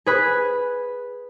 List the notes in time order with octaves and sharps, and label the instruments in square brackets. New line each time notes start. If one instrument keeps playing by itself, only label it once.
[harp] G#4 B4